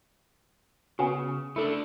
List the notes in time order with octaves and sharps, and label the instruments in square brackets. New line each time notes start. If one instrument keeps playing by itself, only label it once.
[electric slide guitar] C#3 [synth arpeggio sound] B3 C#4 F#4
[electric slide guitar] A3 D4 [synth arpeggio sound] E4 A4